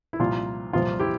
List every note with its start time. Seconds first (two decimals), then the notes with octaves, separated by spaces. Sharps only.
0.13 E4
0.19 C2 A#2 F3 F4
0.73 C2 A#2 F3 F4
1.00 E4 G4